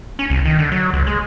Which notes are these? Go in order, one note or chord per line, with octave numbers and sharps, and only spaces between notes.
C#4
C2
D#3
D3
F#3
C#2
G#3